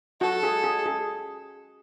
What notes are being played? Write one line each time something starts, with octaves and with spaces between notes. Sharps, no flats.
F#4 A4
G#4
G#4
G#4